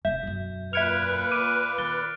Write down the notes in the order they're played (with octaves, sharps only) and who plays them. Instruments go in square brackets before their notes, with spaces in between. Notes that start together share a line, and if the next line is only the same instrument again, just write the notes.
[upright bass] F1 F2 [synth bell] E5 [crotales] G6
[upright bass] E1 F#2
[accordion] A#2 B4 [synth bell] E5 G#6 F7 [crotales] F6 C#7 D7
[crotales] D6 F#6 D7 [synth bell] D#7
[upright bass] D#3 [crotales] F#6 A6 G7